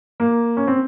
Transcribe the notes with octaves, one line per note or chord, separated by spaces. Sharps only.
A#3
C#4
C4